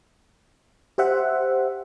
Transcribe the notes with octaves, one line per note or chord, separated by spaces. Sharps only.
G4 C5 E5 F#5